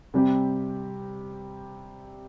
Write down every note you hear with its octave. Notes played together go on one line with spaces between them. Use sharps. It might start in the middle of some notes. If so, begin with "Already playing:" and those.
C3 G3 C4 G4